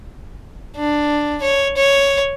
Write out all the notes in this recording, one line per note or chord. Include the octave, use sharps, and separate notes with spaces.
D4
C#5
C#5